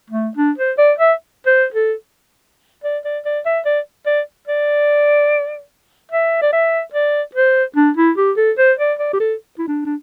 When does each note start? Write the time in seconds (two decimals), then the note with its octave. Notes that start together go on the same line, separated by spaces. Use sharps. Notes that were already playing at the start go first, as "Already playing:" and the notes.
0.10 A3
0.37 D4
0.58 C5
0.78 D5
0.99 E5
1.47 C5
1.74 A4
2.84 D5
3.05 D5
3.25 D5
3.46 E5
3.66 D5
4.06 D5
4.48 D5
6.12 E5
6.42 D5
6.53 E5
6.93 D5
7.35 C5
7.76 D4
7.97 E4
8.17 G4
8.37 A4
8.58 C5
8.79 D5
8.99 D5
9.13 G4
9.20 A4
9.59 E4
9.68 D4
9.86 D4